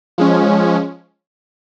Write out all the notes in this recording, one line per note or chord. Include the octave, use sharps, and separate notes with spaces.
F3 G#3 C#4